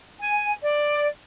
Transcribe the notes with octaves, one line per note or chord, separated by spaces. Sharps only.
G#5
D5